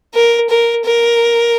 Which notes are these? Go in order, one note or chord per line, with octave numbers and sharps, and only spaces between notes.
A#4
A#4
A#4